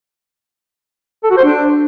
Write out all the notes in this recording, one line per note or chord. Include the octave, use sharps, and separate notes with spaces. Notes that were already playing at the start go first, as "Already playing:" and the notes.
A4
F#4
C5
D4